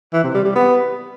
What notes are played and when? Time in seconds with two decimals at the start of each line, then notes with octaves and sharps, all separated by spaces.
0.13 E3
0.24 C3
0.34 G3
0.45 G3
0.55 B3